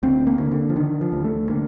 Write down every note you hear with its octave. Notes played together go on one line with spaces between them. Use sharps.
D2 C4
A#3
D3
D3
F3
D3 D#3
F3
D2
A3
D3 A#3